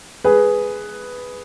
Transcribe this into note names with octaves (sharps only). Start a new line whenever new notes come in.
G#4 B4